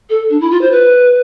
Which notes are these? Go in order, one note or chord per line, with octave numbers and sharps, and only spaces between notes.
A4
D4
E4
F4
C5
B4